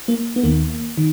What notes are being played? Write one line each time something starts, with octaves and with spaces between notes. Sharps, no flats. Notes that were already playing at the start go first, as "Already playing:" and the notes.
A#3
B3
D#2 D#3 A#3
D#3